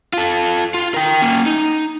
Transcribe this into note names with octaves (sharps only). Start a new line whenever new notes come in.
F4 A4
F4
A#4 G5
A#3 C#4
D#4